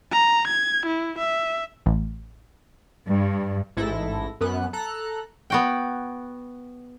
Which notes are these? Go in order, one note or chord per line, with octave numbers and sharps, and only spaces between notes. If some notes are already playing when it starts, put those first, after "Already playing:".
A#5
G#6
E4
E5
A1
G2
A1 G#2 E4 A4 A#6
F#2 B3 F#6
A4 A#5 F#6
B3 F#4 G5